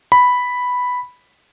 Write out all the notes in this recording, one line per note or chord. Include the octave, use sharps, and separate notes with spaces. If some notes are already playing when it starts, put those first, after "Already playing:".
B5